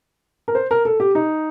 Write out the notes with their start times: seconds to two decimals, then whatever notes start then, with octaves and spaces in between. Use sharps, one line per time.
0.48 A#4
0.55 C5
0.71 A#4
0.85 A4
1.00 G4
1.15 D#4